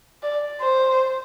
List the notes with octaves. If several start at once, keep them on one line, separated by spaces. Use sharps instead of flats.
D5
C5